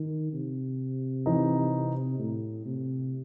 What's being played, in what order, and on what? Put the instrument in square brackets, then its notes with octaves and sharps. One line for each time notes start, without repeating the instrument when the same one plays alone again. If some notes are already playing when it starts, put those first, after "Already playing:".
Already playing: [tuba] D#3
C3
[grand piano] E3 C4 D#4
[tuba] A2
C3